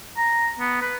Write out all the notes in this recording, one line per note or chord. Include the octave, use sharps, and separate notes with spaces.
A#5
B3
B4